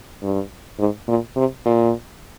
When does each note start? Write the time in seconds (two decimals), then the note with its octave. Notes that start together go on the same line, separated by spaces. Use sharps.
0.23 G2
0.79 G#2
1.08 A#2
1.36 C3
1.65 A#2